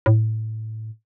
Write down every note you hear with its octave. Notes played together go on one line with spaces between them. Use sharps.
A2